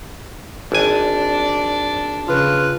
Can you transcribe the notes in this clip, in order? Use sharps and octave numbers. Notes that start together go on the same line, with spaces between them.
G#1 D4 D5 G#5
C#3 F4 B4